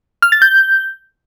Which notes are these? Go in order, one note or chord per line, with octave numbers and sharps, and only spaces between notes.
F6
A6
G6